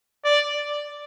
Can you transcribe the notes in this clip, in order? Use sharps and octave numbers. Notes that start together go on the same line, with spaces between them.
D5